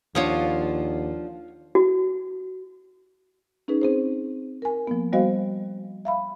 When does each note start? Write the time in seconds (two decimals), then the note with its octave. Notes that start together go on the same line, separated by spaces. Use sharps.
0.15 D#2 F3 D4 F4 C#5 F5 F#5 D#6
1.75 F#4
3.68 C#4 D#4 G#4 B4
3.82 C4 G#4 C5
4.62 A#4 G#5
4.87 F3 A#3 B3
5.13 G3 B3 F#4 C5 D#5 F5
6.05 E5 F5 B5